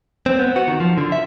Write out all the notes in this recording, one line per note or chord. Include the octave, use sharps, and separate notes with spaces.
C4
B3
F#4
D#3
F3
D3
E5